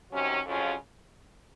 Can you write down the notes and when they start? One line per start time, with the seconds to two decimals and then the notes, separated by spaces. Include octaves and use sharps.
0.12 C3 D#3 F#3 C#4
0.46 F2 C#3 F#3 C#4 F4